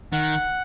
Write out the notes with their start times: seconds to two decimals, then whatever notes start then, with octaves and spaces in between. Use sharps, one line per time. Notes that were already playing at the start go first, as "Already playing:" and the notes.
0.13 D#3 F#5